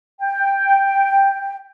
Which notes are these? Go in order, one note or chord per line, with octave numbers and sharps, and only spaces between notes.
G5